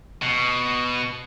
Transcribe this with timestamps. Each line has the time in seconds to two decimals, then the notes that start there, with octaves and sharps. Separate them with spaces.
0.23 B2